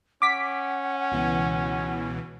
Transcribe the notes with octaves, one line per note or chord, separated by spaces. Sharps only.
C#4 F#5 D6 B6
C#2 B2 E3